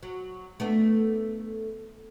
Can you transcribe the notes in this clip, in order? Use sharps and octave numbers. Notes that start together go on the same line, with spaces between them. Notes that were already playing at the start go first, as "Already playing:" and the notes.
F#3
A3 B3 D4